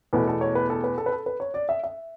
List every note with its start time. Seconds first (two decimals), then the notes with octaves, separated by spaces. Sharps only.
0.13 E2 B2 A3 B4
0.27 A4
0.41 C#5
0.55 B4
0.70 A4
0.84 B4
0.98 A4
1.06 B4
1.12 A4
1.26 B4
1.40 C#5
1.54 D5
1.69 E5
1.84 E5